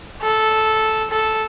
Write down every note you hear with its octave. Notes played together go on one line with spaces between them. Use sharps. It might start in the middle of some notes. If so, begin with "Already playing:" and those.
A4
A4